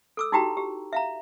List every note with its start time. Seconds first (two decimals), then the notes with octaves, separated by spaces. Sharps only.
0.17 A4 D6 E6
0.32 D#4 E4 F#4 G4 G5 A#5
0.57 G4
0.93 E5 F5 A#5